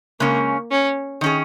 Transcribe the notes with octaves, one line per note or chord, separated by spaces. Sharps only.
C#3 G#3 A#3 C#4
C#4
D#3 C#4 G#4